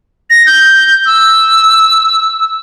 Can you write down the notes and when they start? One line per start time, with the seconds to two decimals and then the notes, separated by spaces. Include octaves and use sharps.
0.30 A#6
0.46 G6
1.06 E6